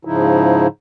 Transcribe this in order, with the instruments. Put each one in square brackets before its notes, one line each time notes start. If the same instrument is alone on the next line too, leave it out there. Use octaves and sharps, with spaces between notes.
[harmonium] G#2 C#3 F3 D#4 E4